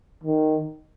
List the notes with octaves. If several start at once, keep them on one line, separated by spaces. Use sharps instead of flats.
D#3